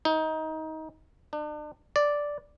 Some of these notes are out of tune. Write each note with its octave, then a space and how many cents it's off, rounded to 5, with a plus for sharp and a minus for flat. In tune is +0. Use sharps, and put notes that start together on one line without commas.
D#4 +20
D4 +40
D5 -5